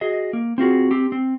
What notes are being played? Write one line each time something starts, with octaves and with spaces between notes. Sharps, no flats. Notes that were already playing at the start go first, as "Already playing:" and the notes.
F#4 G#4 D#5
A#3
C4 F4 F#4 G#4
C4 G4
C4